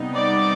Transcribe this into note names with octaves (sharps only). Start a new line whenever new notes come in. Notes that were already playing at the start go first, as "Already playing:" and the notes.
Already playing: C3 G3 B3 D#4
D5